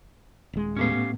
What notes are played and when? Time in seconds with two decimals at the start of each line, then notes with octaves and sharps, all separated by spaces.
0.53 D#1 G#3
0.76 A2 A3 B3 C#4 G4 F5